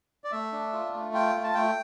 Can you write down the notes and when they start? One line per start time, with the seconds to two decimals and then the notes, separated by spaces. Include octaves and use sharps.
0.24 D5
0.32 A3 E5
0.52 D4
0.73 F4
0.94 A3
1.13 F4 G5
1.35 A3
1.44 A5
1.54 A3 G5